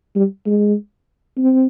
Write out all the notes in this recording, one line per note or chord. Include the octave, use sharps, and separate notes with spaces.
G3
G#3
C4